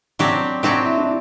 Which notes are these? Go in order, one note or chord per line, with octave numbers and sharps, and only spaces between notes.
F#3 C4 D4 G4
F#3 C4 D4 G4
E4
D4